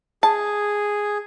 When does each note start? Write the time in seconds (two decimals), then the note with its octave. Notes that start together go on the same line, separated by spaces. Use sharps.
0.23 G#4 A5